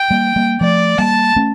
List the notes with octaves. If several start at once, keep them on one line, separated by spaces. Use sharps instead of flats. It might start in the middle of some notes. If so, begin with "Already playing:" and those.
Already playing: G5
G3 A#3
G3 A#3
F3 A3 D5
G3 A#3 A5
A3 C#4